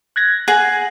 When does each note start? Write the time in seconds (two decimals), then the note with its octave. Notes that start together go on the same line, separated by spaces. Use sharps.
0.16 F#6 G#6 A#6
0.48 G#4 F#5